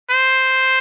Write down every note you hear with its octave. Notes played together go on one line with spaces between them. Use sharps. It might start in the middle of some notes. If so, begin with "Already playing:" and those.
C5